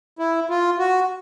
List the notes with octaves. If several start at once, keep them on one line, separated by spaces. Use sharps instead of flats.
E4
F4
F#4